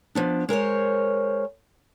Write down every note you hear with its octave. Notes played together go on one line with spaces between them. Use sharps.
F3 B3 D4
G#3 A#4 C5 C#5